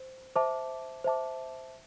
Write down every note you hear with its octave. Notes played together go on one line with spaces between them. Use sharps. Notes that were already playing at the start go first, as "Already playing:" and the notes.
Already playing: C5
C5 E5 A5 D6
C5 E5 A5 D6